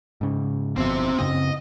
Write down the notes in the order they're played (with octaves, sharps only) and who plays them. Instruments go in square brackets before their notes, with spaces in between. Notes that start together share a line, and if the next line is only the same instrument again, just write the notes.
[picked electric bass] G#2 C#3
[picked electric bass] G1 F2 B2 [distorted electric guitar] C4 E5
[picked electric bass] F#2 C#3 C4 [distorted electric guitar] D#5